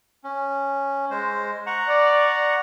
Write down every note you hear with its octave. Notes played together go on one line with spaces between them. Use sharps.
C#4
G#3 C5
F#5 A#5 C#6
D5